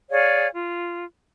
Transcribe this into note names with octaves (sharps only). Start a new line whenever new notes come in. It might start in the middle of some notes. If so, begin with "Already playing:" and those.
G#4 C#5 D5 F5
F4